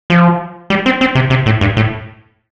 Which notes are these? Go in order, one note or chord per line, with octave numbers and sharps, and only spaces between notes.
F3
G3
C4
C4
C3
C3
A2
G2
A2